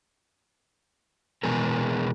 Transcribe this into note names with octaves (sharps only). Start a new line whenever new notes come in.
B2 E3 G#3 B3 G#4 A#4